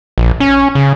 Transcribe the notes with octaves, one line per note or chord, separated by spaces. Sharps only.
A#1
C#4
C#3